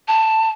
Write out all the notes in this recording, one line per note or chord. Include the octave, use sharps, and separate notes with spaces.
A5